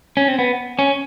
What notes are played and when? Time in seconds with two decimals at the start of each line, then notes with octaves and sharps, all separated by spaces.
0.17 C#4
0.28 C4
0.39 B3
0.79 C#4